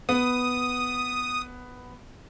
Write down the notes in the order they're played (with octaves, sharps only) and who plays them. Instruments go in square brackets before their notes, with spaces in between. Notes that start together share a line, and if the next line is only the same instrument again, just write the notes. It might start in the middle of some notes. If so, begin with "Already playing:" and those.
[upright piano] B3 [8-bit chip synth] D#6